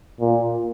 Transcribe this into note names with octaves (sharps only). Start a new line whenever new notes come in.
A#2